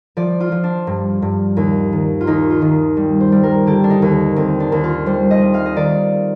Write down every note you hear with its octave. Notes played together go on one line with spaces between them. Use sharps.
F3 D5
F4
F3
D4
G2
G2
D#2
D#3
F4
D#2 D#4
F4
D#3
G3
C5
G3
A#4
D3 G4
D4
D#4
D#2
D#2 C4
D4
D#2
F4
G3 C5
D#5
G3
F5
D#5
D#3 D5